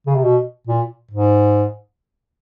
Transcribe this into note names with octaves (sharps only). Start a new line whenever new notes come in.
C#3
C3
B2
A#2
G#2